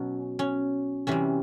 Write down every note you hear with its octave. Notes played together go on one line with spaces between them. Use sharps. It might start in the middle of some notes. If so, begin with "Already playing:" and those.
Already playing: B2 F#3 C#4
C#4
C3 E3 G3 C#4